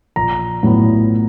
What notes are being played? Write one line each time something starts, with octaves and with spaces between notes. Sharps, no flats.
A#1 A#5
A2 F#3 B3 E4